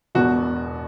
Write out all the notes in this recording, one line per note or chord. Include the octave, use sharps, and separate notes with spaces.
E1 E2 B2 F#4